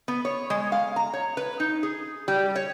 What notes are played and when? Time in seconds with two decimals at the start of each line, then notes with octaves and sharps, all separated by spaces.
0.08 B3
0.25 C#5
0.50 G#3
0.72 F5
0.96 A#5
1.13 C#5
1.37 B4
1.60 D#4
1.83 G#4
2.28 G3
2.56 C#5